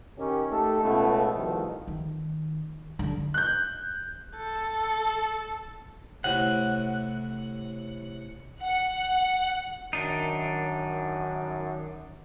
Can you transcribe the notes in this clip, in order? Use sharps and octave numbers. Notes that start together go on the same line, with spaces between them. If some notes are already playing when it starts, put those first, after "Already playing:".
D#3 C#4 G4
A3 D#4 G4 A4
C#2 B2 A3
C2 F2 B2 D#3 F3 A3
D#3
D3 G3
F#6 G6
A4
A2 C3 F#5
F#5
F#2 D#3 D4 D#4